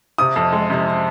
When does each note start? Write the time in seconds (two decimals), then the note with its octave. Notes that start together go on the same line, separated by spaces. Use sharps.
0.18 C3 D#6
0.36 F2
0.52 G#3
0.70 C3